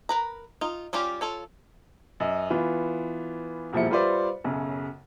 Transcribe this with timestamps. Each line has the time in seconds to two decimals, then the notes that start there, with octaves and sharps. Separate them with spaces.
0.09 A#4 B4 A#5
0.61 D#4 F4
0.93 G3 C#4 F4 G4
1.21 F4 A4 C#5
2.20 F#2 D#5
2.50 E3 B3 F4
3.73 E1 A#2 F3 G3 E4 C#7
3.90 G3 F4 B4 C5 D5 E5
4.44 B1 F#2 C#3